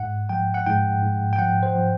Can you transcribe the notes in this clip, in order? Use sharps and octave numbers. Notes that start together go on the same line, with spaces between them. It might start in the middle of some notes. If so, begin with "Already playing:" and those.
Already playing: G#2 F#5
F3 G5
F#5
G#2 G5
G#2
G5
F3 F#5
C5
F3